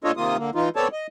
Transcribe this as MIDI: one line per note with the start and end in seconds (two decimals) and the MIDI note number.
0.04 0.12 46
0.04 0.12 62
0.04 0.12 65
0.04 0.12 69
0.04 0.12 73
0.04 0.12 75
0.17 0.37 48
0.17 0.37 51
0.17 0.37 58
0.17 0.37 65
0.17 0.37 87
0.38 0.50 50
0.38 0.50 58
0.55 0.69 52
0.55 0.69 63
0.55 0.69 65
0.76 0.88 59
0.76 0.88 60
0.76 0.88 69
0.76 0.88 73
0.76 0.88 74
0.76 0.88 81
0.92 1.07 75